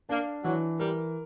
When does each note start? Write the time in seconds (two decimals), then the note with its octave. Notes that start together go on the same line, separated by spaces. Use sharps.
0.09 A#3 D4
0.44 E3 F#3
0.80 G3 A#4